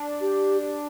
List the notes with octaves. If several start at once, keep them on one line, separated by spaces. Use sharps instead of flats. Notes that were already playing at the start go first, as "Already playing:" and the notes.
Already playing: D4
G4